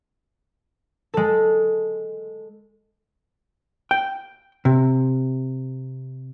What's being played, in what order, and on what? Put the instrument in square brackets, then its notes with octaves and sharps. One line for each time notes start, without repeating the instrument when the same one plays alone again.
[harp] G#3 A4
[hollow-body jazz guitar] G5
C3